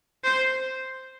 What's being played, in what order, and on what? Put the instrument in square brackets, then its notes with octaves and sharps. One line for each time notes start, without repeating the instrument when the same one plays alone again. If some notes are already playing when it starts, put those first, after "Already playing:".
[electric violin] C5